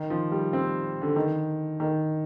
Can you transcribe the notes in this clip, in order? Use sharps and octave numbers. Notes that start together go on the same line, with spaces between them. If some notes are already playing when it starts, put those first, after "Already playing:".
Already playing: D#3
F3
G3
C4
D3
D#3
D#3